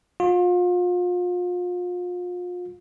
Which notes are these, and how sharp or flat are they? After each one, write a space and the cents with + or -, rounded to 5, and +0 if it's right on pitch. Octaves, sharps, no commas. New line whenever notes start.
F4 +35